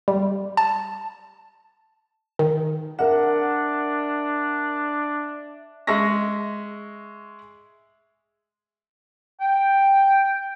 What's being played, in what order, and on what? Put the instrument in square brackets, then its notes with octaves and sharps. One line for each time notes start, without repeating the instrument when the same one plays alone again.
[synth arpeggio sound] G3
A5
D#3
[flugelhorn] D4 [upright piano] A#4 F#5 [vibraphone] E5
[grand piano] G#3 E5 C#6 A#6
[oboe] G5